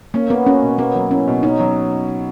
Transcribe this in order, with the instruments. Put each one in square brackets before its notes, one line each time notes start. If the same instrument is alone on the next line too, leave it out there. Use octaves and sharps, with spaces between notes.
[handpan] A#3 [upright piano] C#4
[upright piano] A#3 [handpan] B3
[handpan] C#4 [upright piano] F#4
[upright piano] B2
[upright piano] A#3 [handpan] B3
[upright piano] F#3
[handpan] C#4 [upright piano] E4
[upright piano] B2
[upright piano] C#4 [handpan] D#4
[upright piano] F#3